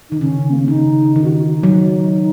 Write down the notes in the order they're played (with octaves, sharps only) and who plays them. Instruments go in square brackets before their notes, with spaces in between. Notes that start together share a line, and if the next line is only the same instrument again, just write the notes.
[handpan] D#3 [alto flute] D#4
[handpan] C#3 [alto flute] C#4
[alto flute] A#3
C#4
[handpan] C#3 [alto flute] D#4
[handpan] D#3 [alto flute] D#4
[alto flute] F#4
D#4
[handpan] F#3